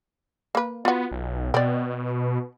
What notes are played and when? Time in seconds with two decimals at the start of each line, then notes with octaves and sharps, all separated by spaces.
0.55 A#3 B4
0.85 B3 F4 F#4
1.12 B1
1.54 B2 C4 D5